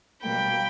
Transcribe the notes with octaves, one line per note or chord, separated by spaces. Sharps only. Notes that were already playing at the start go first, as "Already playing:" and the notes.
B2 G3 A#3 G5 B5